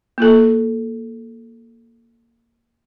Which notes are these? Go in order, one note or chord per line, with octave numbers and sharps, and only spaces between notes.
A#3 F4 A4